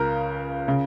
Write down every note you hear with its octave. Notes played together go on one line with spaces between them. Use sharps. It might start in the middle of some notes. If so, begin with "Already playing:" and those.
Already playing: C#2 C#3 A#4
C#3